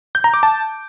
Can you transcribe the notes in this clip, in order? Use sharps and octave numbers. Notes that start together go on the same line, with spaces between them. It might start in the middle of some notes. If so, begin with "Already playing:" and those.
G6
A#5
D6
A5